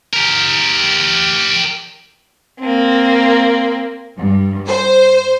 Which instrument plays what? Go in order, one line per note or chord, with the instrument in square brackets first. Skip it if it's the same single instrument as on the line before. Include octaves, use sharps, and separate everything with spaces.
[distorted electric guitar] G4 A#4
[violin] A#3 C4
[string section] G2
C5